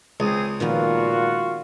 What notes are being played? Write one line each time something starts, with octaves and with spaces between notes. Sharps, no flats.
C#2 C4 G#4 D#6
A#2 D#3 F3 B3 F4 F#4